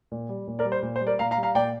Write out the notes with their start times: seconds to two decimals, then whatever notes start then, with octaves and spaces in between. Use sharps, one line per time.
0.12 A#2
0.29 G3
0.48 A#2
0.59 A#4 D5
0.65 G3
0.72 C5
0.83 A#2
0.96 C5
1.01 G3
1.07 A#4 D5
1.19 A#2 F5 A#5
1.31 F5 A#5
1.37 G3
1.43 F5 A#5
1.55 A#2 D5 G5